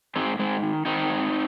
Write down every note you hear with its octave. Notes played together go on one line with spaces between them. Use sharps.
G#2 G#3 C4
G#2 G#3 C4
D#3
D#3 C4 D#4
G#2